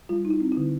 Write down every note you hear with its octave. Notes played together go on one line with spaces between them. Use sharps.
G3 F4
D#4
E4
C4
E4
D3